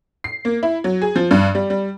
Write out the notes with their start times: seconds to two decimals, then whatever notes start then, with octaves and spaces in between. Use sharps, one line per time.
0.24 C7
0.45 A#3
0.63 E4
0.84 F#3
1.02 G#4
1.16 F3
1.31 G2
1.55 G3
1.70 G3